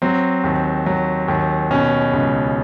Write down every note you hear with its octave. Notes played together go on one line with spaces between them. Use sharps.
F#3 C4
D#2
F#3
D#2
B2 C#4
C#2